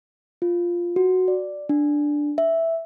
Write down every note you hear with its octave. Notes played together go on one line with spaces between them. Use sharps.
F4
F#4
D5
D4
E5